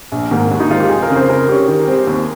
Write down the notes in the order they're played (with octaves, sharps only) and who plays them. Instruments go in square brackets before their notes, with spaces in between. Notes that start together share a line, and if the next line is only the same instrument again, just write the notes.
[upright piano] A#1
G#2 D#3 A#3
D#2
[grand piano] D#4
[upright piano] D#3 G#3 C4 [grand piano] F4
[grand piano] G4
[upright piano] F1 [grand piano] G#4
[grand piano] A#4
[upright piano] F2 C#3
[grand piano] C5
[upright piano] C#3 [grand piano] A#4
[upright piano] G3 C#4 [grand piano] G4
[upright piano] D#3
G3 C4
D#2